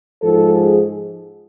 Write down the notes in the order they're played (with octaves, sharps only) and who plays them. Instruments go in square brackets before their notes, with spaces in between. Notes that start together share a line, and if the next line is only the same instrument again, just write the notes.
[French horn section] G#2 F3 A4
G#4